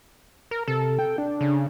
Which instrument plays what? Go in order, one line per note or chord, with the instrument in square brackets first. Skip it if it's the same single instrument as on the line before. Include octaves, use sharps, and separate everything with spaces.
[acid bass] A#4
[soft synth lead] C3 [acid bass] A4
[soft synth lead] G5
D4
[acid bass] C#3